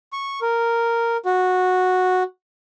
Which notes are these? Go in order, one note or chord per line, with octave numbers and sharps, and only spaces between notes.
C#6
A#4
F#4